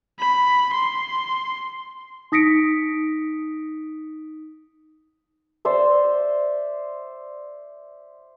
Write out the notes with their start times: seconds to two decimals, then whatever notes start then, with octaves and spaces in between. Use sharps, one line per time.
0.20 B5
0.74 C6
2.32 D#4 D#6 A#6 B6 C#7 D7
5.65 C5 D5 E5 C6